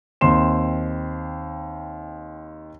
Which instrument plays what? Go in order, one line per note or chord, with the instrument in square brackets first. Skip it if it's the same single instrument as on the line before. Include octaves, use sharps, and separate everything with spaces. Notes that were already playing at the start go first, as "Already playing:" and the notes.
[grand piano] D#2 C4 C6 E7